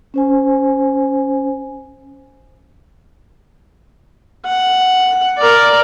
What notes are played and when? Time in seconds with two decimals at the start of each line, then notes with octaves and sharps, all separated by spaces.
0.14 C#4 C5 G#5
4.46 F#5
5.38 A#4 D5